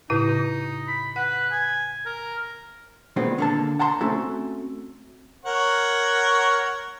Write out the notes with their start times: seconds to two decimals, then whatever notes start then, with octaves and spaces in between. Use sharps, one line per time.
0.10 A2 C#3 D#4 E4
0.88 B5
1.16 B4 F#5
1.51 G#5
2.06 A#4
3.16 A#2 D#3 G#3 B3 C4
3.38 D3 A#3 A5
3.79 F#5 A5 A#5 C6
4.01 A3 C4 C#4 F#4 A4
5.46 A#4 C#5 F#5